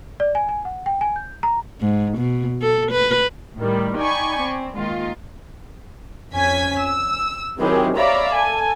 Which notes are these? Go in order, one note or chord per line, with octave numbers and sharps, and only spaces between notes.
D5
G#5
G#5
F#5
G5
G#5
G6
A#5
G#2
B2
A4
B4
A2 D#3 G3
D#4 D5 G5 G#5 B5 C#6
C4
D#3 G#3 A#3 F4
F2 C#4 G#5 G#6 B6
E6
C3 D#3 F#3 E4 G4 G#4
C#5 D5 E5 F5 A#5 B5
A4 G#5